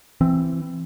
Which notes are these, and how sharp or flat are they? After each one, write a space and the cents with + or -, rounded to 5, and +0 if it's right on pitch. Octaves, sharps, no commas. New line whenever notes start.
E3 +15 C4 +0